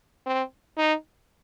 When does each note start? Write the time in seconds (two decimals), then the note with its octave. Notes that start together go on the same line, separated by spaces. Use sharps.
0.27 C4
0.78 D#4